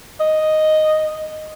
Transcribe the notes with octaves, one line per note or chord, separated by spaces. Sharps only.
D#5